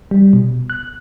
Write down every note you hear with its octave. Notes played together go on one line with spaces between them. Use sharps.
G3
B2
F#6